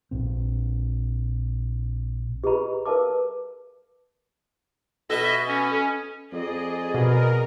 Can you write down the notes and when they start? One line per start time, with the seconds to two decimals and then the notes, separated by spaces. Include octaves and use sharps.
0.11 A#1 A#2 C4
2.44 G4 G#4 B4 D#5 A#5 B5
2.85 A#4 B4 F5 A5 D6
5.10 B2 A4 D#5 E5
5.47 C#4
6.33 F2 G#4 D5 D#5
6.94 B2 A#4